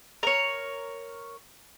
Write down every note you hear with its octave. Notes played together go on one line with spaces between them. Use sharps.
A#4 C#5